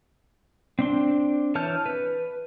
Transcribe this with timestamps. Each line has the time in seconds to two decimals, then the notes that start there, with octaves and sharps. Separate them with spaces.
0.79 C4 D4 C6
1.55 E3 C#5 A5 F6 G6
1.86 B4